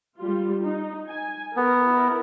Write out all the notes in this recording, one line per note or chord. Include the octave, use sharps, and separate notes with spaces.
G3 F4
D#4
G#5
B3 A#4
E4 A#4